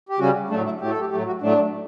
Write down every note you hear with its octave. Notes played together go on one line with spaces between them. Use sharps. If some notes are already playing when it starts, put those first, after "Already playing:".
G4
C#3 G3 C#4 F#4
A2 F#3 A3 D4
E4
A2 F#3 A3 G4
A4
G4
A2 F#3 A3 G4
F#4
A2 F#3 A3 D4